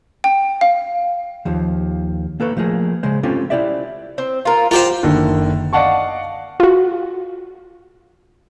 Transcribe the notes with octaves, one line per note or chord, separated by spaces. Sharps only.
G5
F5
D#2 F3
A#3 A4 B4 C#5
F3 A3 A#3 G#4
C#3 G#3 C5
C4 C#4 F4 G4 A4
E4 G4 C5 D5 E5
C4
F4 A#4
F4 G4 A#4 C5 F#5
F#1 D3 D#3
D5 D#5 F5 F#5 A5 C#6
F4 F#4